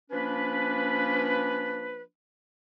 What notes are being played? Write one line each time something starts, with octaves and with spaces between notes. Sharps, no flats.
F3 A#3 C#4 D4 B4